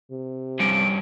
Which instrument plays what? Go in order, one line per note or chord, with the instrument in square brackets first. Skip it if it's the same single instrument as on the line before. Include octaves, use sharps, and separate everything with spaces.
[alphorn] C3
[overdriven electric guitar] G2 C#4 [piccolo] D7